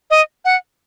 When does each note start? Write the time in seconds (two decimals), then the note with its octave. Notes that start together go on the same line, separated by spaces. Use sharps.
0.10 D#5
0.45 F#5